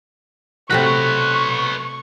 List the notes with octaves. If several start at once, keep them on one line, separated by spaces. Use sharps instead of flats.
C3 A3 F#4 B4 C#5 C#6